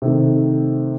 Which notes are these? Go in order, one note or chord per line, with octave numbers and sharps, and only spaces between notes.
C3 D#3 A3